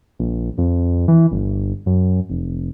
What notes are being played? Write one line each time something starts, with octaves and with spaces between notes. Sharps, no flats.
A#1
F2
E3
G1
F#2
F1